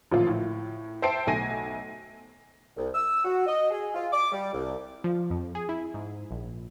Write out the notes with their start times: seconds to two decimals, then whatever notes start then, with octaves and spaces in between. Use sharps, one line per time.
0.11 A1 A#2 F3 F4
0.27 A2
1.02 C5 E5 G5 A5 C7 D7
1.27 B1 A3 G#5 A#6 D#7
2.77 C2
2.95 E6
3.25 F#4
3.47 D#5
3.71 G#4
3.95 F4
4.13 D6
4.32 G3
4.53 C2
5.04 F3
5.30 F2
5.55 G#4
5.69 E4
5.94 G#2
6.31 A#1